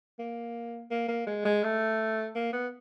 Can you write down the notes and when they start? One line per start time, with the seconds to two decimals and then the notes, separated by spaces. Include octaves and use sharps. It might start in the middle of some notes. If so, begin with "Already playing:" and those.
0.19 A#3
0.91 A#3
1.08 A#3
1.27 G#3
1.45 G#3
1.63 A3
2.35 A#3
2.53 B3